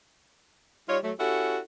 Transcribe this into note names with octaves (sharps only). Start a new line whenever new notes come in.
G3 D#4 F4 C#5
F#3 A3
C#4 E4 F#4 G4 A4